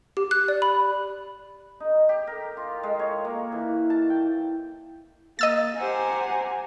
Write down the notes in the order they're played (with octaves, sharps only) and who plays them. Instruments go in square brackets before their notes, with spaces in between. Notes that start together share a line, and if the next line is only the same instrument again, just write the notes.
[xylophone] G4
F#6
D5
B5
[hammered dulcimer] D#4
G4
A#4
F4
G#3
C#5
A#3
E3
A5
G5
[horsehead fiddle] A#3 [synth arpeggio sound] D#5 E6 A6
[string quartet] G4 C5 F#5 [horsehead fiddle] G#5 A#5